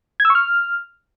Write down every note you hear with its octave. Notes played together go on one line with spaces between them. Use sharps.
G#6
E6
C#6
F6